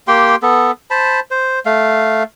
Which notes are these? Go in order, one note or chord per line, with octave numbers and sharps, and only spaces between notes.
A#3 G4 G5 C6
B3 A4
C5 A5 B5
C5
A3 F5